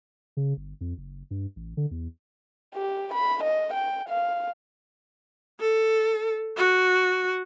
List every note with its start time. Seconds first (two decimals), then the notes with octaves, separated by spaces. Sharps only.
0.37 C#3
0.57 G1
0.81 F2
0.98 F#1
1.31 G2
1.56 A1
1.77 D3
1.91 E2
2.74 G4
3.14 B5
3.44 D#5
3.74 G5
4.09 F5
5.59 A4
6.57 F#4